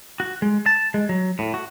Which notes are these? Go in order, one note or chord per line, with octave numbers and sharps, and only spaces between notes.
F#4
G#3
A5
G#3
F#3
A2
F#4